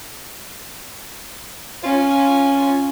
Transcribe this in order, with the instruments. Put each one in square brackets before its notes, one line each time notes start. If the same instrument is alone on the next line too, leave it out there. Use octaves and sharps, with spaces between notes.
[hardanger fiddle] C#4 [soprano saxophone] F4